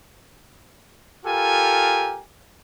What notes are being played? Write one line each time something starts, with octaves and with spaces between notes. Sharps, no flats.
F4 G4 A4 A#4 G#5